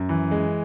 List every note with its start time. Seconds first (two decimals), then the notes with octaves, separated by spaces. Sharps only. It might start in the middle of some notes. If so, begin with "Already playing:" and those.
Already playing: F#2
0.09 E3
0.31 G#3